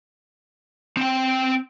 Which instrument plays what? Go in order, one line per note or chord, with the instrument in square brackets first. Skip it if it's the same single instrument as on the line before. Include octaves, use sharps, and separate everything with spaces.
[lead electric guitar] C4 G5